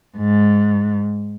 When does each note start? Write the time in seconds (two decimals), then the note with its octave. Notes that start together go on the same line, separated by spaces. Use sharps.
0.17 G#2